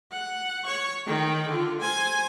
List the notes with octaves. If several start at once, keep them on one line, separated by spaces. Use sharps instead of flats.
F#5
C#5 C#6
D#3 G5
D3 F4
C5 G#5